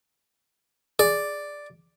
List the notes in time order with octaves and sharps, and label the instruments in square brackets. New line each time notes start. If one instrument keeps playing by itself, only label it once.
[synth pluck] G#4 [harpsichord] D5